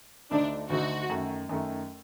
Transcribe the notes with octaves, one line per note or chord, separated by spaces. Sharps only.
D2 D3 A3 D4 D#4
D2 D3 A3 D#4 F#4
F#2 D#3 A3
F#2 D#3 A3